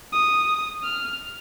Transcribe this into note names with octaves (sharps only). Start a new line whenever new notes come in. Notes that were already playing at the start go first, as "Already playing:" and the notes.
D#6
F6